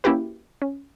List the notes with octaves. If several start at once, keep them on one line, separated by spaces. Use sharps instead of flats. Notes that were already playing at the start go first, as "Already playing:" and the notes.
A#3 C#4 E4 F#4 G4 B4
C#4